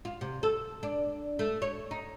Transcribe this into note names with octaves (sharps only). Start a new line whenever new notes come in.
F4
C3
A4
D4
A3
C#5
D#4